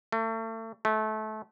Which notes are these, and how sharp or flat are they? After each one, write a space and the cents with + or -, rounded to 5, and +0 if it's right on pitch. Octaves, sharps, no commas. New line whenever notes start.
A3 +35
A3 -25